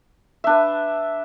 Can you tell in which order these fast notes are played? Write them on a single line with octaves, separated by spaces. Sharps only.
E5 D4 B4